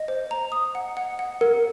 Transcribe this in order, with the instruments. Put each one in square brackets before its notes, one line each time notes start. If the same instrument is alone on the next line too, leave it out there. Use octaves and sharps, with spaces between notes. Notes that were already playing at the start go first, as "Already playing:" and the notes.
Already playing: [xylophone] D#5
C5
A#5
D#6
F#5
F#5
F#5
[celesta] A#4 [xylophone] F#5